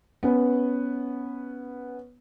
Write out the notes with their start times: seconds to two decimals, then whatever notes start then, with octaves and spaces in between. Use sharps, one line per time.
0.23 B3 C#4 B4